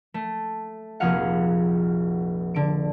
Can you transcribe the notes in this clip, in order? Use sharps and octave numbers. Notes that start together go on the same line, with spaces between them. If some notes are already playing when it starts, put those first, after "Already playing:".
A3
F1 A#1 F#4 G#4 F5 F#5
D3 D7